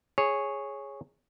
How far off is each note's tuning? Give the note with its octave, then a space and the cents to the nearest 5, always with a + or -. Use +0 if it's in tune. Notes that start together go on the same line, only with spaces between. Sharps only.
G#4 +0 C#5 -5